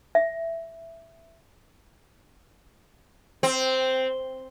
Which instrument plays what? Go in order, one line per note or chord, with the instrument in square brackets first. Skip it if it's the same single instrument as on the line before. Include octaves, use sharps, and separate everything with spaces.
[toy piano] E5
[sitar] C4